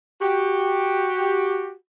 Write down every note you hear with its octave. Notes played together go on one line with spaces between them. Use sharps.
F#4 G4